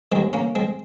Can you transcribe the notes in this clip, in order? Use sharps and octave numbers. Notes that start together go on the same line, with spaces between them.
D#2 D#3 G#3 C4
A#3 C#4
G#3 C4